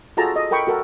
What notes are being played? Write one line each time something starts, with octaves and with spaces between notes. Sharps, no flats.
F4 F#4 G#4 A4 A5 A#5
D#5
A4 A#4 G5 B5 C#6
F#4 A4 A#4